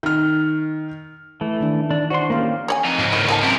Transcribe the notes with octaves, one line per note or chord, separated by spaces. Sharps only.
D#3 F6
E3 A3
D#3 D4
E3 D4
E4 F#4 C5 D5 C6
A#3 C#4 G4 F5
C#5 D5 G#5
F2 D#4
C#2 G#2
A2 D#3 E4 D#5
A#3 C4 D#4 A5
F#2 C3 E4 A#4